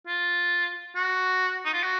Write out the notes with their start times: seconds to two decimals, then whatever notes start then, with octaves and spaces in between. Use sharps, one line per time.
0.07 F4
0.96 F#4
1.65 D#4
1.73 F4
1.83 F#4